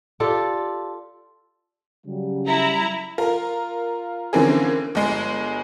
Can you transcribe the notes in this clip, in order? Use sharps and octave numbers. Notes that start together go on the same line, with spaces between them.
F4 G4 A4 D5
C#3 F#3 G3
E4 A#5
F4 A#4
D3 E3 A#3 C4 C#4 G#4
G1 G#3 C7